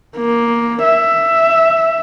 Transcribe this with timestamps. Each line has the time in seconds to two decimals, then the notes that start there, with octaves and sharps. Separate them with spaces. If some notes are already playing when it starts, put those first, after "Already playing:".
0.17 A#3
0.83 E5